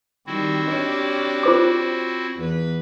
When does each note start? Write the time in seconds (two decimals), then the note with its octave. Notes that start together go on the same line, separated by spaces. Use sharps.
0.27 D#3 G3 C4 E4 F#4
0.68 C#4 D4 G4 D#5
1.43 F4 C5 D6
2.36 E2 B4